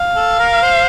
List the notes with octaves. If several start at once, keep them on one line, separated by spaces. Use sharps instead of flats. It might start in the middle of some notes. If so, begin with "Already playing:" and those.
Already playing: F5
A4
A#4
C5